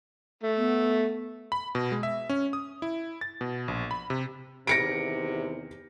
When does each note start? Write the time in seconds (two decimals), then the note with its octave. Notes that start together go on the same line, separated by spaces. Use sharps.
0.43 A3
0.57 B3
1.52 B5
1.75 B2
1.92 G#3
2.03 E5
2.29 C#4
2.53 D#6
2.82 E4
3.21 A6
3.41 B2
3.68 A#1
3.91 B5
4.10 C3
4.67 E2 C3 D#3 A#6 C#7 D7